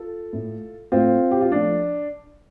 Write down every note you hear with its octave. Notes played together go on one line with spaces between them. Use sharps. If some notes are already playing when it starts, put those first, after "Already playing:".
Already playing: F4 A4
A2 A3
A2 A3 C4 F4
G4
F4
F3 A3 D4